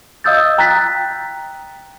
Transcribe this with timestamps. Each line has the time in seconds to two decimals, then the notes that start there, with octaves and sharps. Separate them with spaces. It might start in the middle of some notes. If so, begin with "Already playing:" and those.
0.24 D#5 F5 D#6 E6 G6 A6
0.58 G5 A#5 F#6 A6 B6